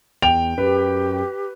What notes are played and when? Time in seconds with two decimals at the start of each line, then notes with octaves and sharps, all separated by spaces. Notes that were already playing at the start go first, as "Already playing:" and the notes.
0.22 E2 G5 F7
0.58 F#2 G4 B4